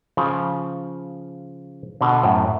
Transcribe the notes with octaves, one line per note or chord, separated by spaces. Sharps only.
C#3 F3
B2 D3
F#2 A2